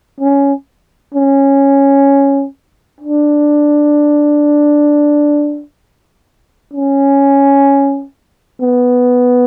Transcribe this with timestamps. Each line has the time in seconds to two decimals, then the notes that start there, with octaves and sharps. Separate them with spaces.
0.21 C#4
1.14 C#4
3.01 D4
6.74 C#4
8.61 B3